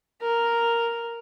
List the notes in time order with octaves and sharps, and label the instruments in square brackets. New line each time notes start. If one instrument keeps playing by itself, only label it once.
[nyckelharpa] A#4